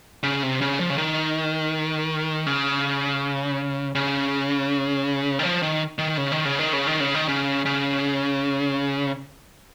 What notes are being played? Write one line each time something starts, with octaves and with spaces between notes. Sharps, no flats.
C#3
C3
C#3
F3
C#3
D#3
C#3
C#3
D#3
F3
D#3
D#3
C#3
D#3
C#3
D#3
C#3
D#3
C#3
D#3
C#3
C#3